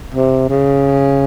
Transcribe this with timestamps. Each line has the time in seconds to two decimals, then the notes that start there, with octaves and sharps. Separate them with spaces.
0.14 C3
0.49 C#3